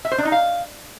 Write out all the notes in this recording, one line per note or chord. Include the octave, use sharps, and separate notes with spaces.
E5
C5
D4
D#4
F5